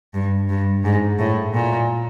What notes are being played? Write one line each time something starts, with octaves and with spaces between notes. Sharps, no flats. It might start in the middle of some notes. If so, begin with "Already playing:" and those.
G2
G2
G#2
A2
A#2